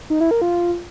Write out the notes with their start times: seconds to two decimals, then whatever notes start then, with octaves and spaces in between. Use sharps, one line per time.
0.10 D#4
0.20 E4
0.31 A#4
0.42 F4